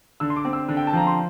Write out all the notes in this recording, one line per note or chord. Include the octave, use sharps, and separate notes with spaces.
D3 E6
C6
D6
C4
E6
D3
G5
A5
F3 A#5
C6